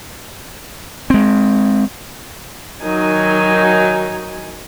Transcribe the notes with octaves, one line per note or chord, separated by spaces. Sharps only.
G#3 C4
D#3 F#3 D#4 G#5